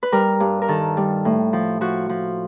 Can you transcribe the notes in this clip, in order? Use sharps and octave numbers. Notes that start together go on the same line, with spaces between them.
B4
G3 A#4
G2
A#4
D#3 A4
G3
A2
F3
F3 F#4
F3